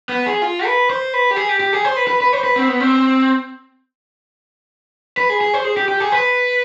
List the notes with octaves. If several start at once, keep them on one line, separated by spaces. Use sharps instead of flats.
B3
G#4
F4
B4
C5
B4
G4
G#4
G4
G4
G#4
C5
B4
B4
B4
C5
B4
C4
B3
C4
B4
G#4
G#4
C5
G#4
G4
G4
G#4
B4